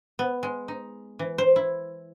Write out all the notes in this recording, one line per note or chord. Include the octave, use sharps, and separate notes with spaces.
B3
G#3
D#4
E3
C5
E4